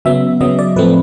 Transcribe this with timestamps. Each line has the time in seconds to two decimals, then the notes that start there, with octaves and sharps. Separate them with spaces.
0.05 C#3 F#3 B3 E5
0.41 C#3 F#3 B3 D#5
0.59 D5
0.76 A2 F3 A3 C4 B4